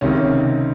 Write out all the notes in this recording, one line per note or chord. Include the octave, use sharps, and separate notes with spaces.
C#2 C3 D#3 C#4